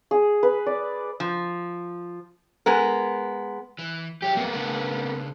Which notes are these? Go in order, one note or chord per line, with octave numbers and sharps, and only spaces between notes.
G#4
B4
D5
F3
G#3 B3 A#4
E3
F2 G4 C#5 E5
A#3 B3
C#3 D4 B4